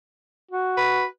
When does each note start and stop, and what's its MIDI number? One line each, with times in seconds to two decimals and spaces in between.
0.51 1.05 66
0.77 1.04 71